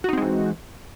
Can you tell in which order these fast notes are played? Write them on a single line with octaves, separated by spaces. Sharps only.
F#4 D#4 C4 G#3 E3